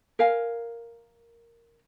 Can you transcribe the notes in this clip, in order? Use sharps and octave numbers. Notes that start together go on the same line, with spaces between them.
A#4 F5 G#5